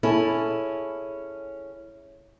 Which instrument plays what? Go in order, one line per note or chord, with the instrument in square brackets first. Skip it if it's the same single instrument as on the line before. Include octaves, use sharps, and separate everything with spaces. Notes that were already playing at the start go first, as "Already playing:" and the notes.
[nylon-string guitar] C#4 E4 G#4 A4